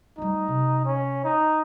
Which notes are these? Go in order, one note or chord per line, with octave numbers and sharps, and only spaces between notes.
G3 A3 D#4
C3
C#4
D#4